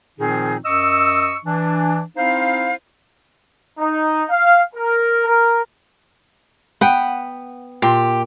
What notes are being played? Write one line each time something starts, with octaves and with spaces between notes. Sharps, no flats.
A#2 D#3 F3 C4 D#4 G#4
F#2 D#5 C#6 E6
E3 D4
C4 D#4 E4 C5 F5
D#4
F5
A#4
A#4
B3 B4 F#5 G5
A#2 G4 C6